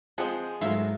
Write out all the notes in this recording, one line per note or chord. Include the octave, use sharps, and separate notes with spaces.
F3 G#3 C4 G#4 F#5
G#2 F#3 A3 A#3 E4 F4 E5